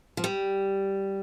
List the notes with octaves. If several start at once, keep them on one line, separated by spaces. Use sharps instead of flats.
F3
G3